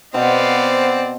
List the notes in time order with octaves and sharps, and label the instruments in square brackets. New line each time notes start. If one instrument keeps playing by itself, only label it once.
[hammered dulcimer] B2 F#4 C5 [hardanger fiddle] B3 F5 [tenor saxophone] C4 [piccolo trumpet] D5